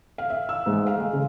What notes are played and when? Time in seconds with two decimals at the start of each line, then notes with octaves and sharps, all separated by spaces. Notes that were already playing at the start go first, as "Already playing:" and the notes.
0.18 F5
0.30 E5
0.49 E6
0.66 G#2
0.87 F5
0.98 G#3
1.13 C#3